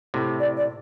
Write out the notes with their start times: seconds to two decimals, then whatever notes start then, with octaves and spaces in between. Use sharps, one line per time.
0.14 A2 C3
0.40 D5
0.57 D5